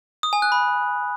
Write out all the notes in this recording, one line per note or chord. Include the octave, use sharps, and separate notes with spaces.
D#6
G#5
F#6
B5